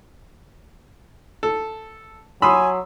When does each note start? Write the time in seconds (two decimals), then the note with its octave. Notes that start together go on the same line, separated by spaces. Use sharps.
1.43 A4
2.42 F#3 G#5 B5 C6 D#6 E6